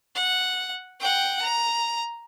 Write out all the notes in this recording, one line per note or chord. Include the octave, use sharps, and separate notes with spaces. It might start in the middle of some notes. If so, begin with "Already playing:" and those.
F#5
F#5 G5
A#5